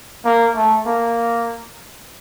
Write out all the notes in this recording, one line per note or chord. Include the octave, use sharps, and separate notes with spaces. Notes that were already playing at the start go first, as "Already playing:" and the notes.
A#3
A3
A#3